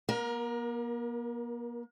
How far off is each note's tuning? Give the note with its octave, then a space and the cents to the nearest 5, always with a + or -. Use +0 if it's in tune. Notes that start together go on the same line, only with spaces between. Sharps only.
A#3 +45 A#4 +15